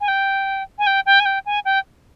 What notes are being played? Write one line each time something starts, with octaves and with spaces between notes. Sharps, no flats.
G#5
G5
G#5
G5
G5
G#5
G5
G#5
G5